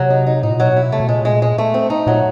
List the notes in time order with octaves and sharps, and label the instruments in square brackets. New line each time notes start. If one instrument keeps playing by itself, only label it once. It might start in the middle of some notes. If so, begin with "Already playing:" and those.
Already playing: [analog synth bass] C3 [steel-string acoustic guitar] F#3
[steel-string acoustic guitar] D#4
D#4
[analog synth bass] A2 [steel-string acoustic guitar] D#4
[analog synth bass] A#2
[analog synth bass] B2 [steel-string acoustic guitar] F#3
[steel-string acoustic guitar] E4
[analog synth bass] C3 [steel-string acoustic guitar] A3
[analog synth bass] B2
[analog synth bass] A#2 [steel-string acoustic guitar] G#3
[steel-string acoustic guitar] G#3
G#3
A3
C4
D#4
[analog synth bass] A#2 [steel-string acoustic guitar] F#3